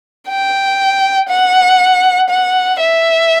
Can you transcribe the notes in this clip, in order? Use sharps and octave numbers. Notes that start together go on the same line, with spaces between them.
G5
F#5
F#5
E5